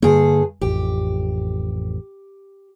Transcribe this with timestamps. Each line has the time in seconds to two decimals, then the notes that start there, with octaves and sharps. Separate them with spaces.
0.02 G2 D3 A#3 G#4 A4
0.61 A1 F2 G4